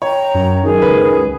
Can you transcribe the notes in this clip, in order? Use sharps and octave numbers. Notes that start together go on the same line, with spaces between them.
C#5 G5 A#5
F#2
D#3 G#4
C#2 B4